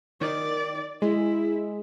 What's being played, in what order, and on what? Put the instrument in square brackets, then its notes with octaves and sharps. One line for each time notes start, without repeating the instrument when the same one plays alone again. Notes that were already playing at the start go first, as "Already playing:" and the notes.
[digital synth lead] D#3 [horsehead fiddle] D5
[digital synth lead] G#3 [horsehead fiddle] E4